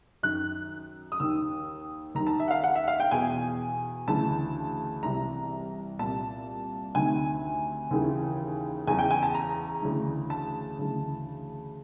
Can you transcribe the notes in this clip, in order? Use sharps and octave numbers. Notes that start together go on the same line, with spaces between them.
F#2 D#3 F#6
D#6
D#2 D#3 E6
D#2 D#3 A#5
A5
E5
F#5
F5
F#5
E5
F5
G5
E2 B2 G#5
D2 C#3 E3 A5
C2 C3 E3 A#5
C2 A#2 A5
D2 C3 D#3 G#5
D#2 C#3 E3
E2 C#3 E3 G#5
G5
G#5
A5
A#5
D2 C#3 E3
A5
D2 C#3 E3